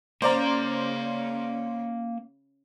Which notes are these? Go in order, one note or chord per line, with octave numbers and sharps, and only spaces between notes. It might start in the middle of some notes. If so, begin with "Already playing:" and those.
C#3 A#3 C#4 A#4 C5 D5 A#5